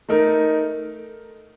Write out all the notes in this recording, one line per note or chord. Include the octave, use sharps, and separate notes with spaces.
A3 D#4 A#4